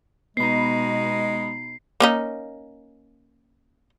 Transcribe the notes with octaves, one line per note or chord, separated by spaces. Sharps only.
B2 G#3 B3 D#4 B5 C7
A#3 C#4 D#4